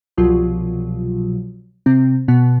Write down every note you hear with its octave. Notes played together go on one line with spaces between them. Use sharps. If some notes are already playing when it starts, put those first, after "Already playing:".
C2 B2 F3 F#3 F4
C3 C4
B2 B3